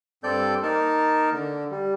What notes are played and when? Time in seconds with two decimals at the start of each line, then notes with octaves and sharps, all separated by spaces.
0.24 G2 C4 A4 D5 G6
0.63 A#3 D#4 A#4 A5
1.33 D3
1.71 G3